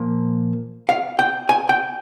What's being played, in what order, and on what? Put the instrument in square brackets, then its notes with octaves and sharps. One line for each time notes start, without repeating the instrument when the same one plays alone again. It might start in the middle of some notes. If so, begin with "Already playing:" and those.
Already playing: [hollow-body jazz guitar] A#2 F3 A#3
F5
G5
G#5
G5